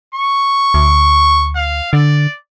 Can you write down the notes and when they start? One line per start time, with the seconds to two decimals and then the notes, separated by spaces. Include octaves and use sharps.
0.15 C#6
0.74 D2
1.56 F5
1.93 D3 D5